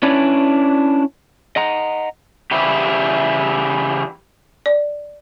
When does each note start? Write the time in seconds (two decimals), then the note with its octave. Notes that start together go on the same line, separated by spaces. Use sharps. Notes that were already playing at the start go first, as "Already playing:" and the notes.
0.03 C#4 D4 E4 B4 C#5 D5
1.56 D#5 F#5 A#5
2.51 C#3 E3 G3 E4 G4
4.66 D5